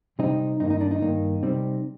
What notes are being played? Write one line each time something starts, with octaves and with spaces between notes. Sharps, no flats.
C3 G3 C4 D#4
G2 D#3 A#3 D#4
D#4
D4
D#4
G2 D#3 A#3
C3 G3 C4